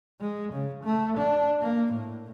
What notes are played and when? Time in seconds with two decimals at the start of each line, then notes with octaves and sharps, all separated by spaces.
0.20 G#3
0.53 C#3
0.84 A3
1.17 D4
1.62 A#3
1.93 A2